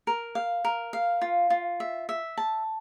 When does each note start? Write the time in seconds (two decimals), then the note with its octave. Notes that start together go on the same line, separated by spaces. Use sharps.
0.07 A#4
0.35 F5
0.65 A#4
0.93 F5
1.22 F4
1.50 F4
1.80 E5
2.09 E5
2.38 A5